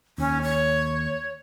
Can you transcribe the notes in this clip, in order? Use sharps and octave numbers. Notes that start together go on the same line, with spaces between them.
D#2 C#4
C#5